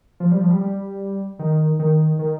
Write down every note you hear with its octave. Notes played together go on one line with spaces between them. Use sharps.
F3
G3
F3
G3
G3
D#3
D#3
D#3